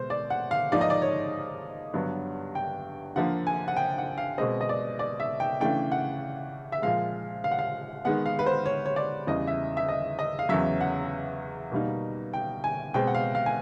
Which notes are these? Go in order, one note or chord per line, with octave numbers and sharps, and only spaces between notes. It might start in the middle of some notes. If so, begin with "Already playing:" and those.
Already playing: B2 G#3 C5
D5
F#5
F5
G#2 F3 A#3 D#4 D5
D#5
D5
C#5
G2 D3 F#3 B3 D4
G5
D3 F3 A#3 F#5
G#5
F#5
G5
F#5
F5
B2 G#3 C4 D#5
D#5
D5
D5
E5
G5
C#3 E3 A3 D4 G5
F#5
E5
A#2 F3 G#3 F5
F5
F#5
F5
D#3 G#3 B3 F#5
F5
B4
C5
C#5
C#5
D5
E2 C#3 E3 G3 D#5
E5
E5
D#5
D#5
F5
E2 C#3 F#3 E5
F#5
B2 G3 A#3 D#4
G5
G#5
B2 G#3 C4 G5
F#5
F5
F5
G#5